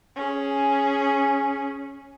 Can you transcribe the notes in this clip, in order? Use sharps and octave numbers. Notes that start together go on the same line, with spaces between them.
C#4 G#4